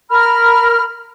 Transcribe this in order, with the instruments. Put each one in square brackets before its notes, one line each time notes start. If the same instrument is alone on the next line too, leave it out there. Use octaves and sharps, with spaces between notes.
[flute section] A#4 B5 F6